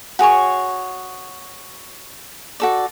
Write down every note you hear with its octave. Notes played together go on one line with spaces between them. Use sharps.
F#4 G#4 C#5 C#6
F#4 A4 D5